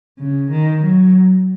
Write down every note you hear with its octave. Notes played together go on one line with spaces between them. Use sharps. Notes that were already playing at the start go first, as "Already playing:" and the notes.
C#3
D#3
F#3